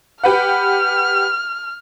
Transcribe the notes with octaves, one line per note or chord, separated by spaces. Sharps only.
G4 B4 F#5 F6